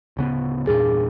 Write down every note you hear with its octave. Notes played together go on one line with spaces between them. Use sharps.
D1 C#3 B3
E2 G2 A#2 G#4